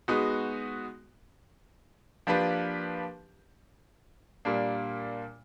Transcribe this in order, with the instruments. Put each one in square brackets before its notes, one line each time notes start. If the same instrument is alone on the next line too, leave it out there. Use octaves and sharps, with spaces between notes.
[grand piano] G#3 B3 D#4 F#4
F3 A#3 D4 G4 B4
A#2 G3 A#3 D4